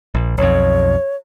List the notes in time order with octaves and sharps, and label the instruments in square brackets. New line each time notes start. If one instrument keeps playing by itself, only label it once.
[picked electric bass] A#1
[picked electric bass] B1 F2 [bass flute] C#5